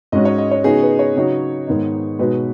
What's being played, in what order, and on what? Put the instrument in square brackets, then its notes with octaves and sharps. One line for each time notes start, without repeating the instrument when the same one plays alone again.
[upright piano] G#2 G#3 C#4 F#4 [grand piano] D#5
[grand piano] C#5
D#5
C#5
[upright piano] C#3 B3 D#4 F#4 [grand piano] G#4
[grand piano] B4
C#5
[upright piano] C#3 F#3 D#4 F#4
G#2 D#3 B3 D#4
[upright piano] B2 G#3 D#4 F#4 [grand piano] B4